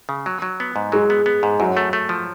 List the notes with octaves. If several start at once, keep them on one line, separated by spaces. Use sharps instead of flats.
C#3
F#3
F#3
B3
G#2
F#3 G#3
B3
B3
G#2
F#2 F#3
A3
A3
F3